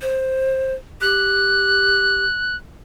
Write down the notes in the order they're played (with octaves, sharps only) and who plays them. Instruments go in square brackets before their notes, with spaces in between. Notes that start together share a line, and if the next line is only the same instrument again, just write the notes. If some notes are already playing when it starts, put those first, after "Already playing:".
[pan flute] C5
[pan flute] G4 [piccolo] F#6